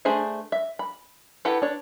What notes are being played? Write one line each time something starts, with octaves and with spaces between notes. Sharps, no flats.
A3 D4 G#4 C5 E5
E5
B5
E4 G4 A4 B4 F#5
D4 C#5